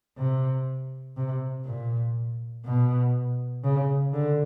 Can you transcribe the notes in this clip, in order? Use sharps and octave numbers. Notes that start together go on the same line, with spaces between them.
C3
C3
A#2
B2
C#3
D3